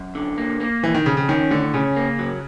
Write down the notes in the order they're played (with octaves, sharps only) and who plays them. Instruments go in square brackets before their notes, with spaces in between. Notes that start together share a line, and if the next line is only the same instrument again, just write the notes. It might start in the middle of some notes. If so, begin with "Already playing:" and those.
Already playing: [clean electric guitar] F#2
D3
A#3
A#3
[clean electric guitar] F2 [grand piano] E3
[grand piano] D#3
[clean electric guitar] F2 [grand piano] C#3
[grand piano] C#3
[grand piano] D#3 [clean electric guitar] C#4
[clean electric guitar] A2 [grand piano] D3
[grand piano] C#3 [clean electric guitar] C#4
[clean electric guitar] A#3
F#3